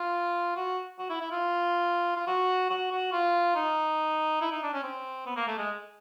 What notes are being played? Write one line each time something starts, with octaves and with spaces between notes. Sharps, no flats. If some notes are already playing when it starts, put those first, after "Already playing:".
Already playing: F4
F#4
F#4
E4
E4
F4
F4
F#4
F#4
F#4
F4
D#4
E4
D#4
D4
C#4
C4
B3
A#3
A3
G#3